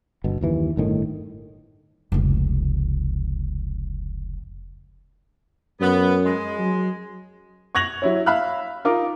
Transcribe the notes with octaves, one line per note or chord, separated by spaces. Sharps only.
G1 B2
F#1 D#2 E3
G1 A2 D#3
F1 C#2
F#2 B3
G#3
F#3
C#6 F#6 G#6 A#6 F7 F#7
F#3 E4 C#5
E5 F5 B5 F6 F#6
D#4 F4 A#4 D6